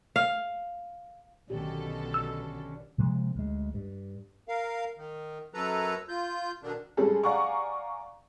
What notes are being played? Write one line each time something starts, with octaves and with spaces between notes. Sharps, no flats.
F5
B1 B2 D3 D#3 C#4 D4 G4 A4
E6
C3 F3 G#3 A#3
D2 G#3
G2
A#4 F5
D#3
F#2 F#3 A4 B4 A#5
F4 G6
B2 D3 D#3 D4
G3 G#3 C#4 G#4 A4
D5 F5 F#5 G#5 A#5 C#6